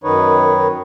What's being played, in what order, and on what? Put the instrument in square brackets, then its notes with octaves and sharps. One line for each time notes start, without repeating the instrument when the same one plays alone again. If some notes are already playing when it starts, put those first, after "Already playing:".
[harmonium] F#2 D#3 D#4 B4 C#5